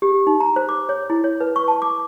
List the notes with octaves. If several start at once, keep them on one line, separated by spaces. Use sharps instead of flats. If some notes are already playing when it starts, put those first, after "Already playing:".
G4
D#4
A#5
C5
D6
C#5
E4
C#5
B4
C#6
A5
D6